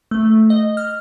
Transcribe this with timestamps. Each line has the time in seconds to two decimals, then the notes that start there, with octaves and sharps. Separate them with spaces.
0.11 A3
0.50 D#5
0.77 F6